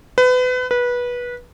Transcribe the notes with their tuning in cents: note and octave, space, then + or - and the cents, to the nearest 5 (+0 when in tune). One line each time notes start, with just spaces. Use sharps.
B4 +30
B4 -20